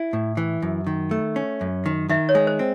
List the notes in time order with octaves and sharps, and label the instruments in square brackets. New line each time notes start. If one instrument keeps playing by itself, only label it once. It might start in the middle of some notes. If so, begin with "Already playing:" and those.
Already playing: [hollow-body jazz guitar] E4
A2
E3
F#2
D#3
A3
C#4
F#2
D#3
[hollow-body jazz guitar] D#3 [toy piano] E5
[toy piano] C#5
[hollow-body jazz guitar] G#3
[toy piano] C5
[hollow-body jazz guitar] C4